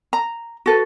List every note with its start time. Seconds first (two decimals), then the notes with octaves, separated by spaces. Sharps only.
0.13 A#5
0.66 F#4 A4 B4